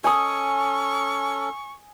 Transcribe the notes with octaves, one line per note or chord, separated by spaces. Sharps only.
C#4 A4 G#5 C#6 D#6